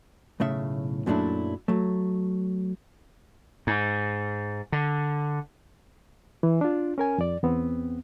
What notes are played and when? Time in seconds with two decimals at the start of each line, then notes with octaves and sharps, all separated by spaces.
0.40 B1 A2 C#3 E5
1.06 F#2 A#2 F#3 A3 D4 E4
1.68 F#3 A3
3.67 G#2
4.72 D3
6.43 E3
6.61 D4 F4
6.98 C#4 A#4 G#5
7.18 F2 D5
7.43 E2 B3 C4